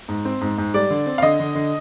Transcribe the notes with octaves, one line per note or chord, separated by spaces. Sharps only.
G#2
C4
G#2
G#2
G3 D5
D3
C4
F5
D3 D#5
D3
D3